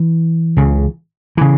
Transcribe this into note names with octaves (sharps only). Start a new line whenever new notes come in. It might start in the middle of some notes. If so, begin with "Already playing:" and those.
Already playing: E3
C#2 C#3
C#3 E3